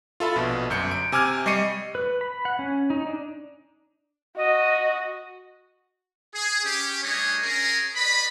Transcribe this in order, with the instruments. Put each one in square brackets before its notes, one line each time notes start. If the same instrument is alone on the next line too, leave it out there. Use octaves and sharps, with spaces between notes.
[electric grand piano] F4 A4 E5 B5
A#1 B2
G1 F#2 G6 C#7
D7
C3 G#5 D6 F6 G#6
G3 D#5 C#6 C7 C#7 D#7
[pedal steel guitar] B4
B5
F#5
C#4
D#4
D4
[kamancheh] F#4 [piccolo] D#5
[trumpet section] G#4
C#4 G4
G3 A3 D4 G#4 C#5 D#5
C#4 G#4 A#4
B4 D5 D#5 B5